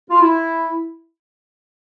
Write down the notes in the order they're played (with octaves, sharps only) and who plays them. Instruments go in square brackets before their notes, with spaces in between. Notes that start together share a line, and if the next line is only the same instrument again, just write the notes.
[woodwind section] F4
E4